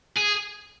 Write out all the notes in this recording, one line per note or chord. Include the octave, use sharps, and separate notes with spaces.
G#4